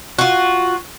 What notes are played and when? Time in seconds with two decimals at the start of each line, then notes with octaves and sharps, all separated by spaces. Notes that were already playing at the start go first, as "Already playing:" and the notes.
0.19 F4 F#4